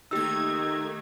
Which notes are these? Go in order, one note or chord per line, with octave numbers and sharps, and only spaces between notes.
D#3 A3 A#3 D#4 G4 E6 G#6